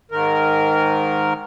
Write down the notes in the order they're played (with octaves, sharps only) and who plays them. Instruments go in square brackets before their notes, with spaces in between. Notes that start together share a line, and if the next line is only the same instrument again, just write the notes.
[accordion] G#2 D#3 A#4